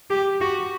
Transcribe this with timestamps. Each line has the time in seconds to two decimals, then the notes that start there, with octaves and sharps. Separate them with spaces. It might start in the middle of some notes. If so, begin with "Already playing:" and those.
0.10 G4
0.41 F#4